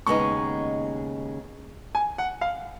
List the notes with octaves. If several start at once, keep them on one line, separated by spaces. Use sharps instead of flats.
D#2 C#3 G#3 B3 D#4 C#6
G#5
F#5
F5